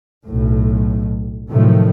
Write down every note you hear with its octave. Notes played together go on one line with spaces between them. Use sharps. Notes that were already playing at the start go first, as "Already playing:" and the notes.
B1 A2
A2 C3 D#3 F3 F#3 A3